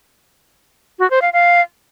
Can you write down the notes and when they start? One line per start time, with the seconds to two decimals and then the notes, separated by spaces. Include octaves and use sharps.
0.99 F#4
1.10 C5
1.22 F5
1.33 F5